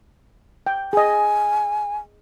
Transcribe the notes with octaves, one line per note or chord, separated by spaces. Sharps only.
G5
G#4 D#5 G#5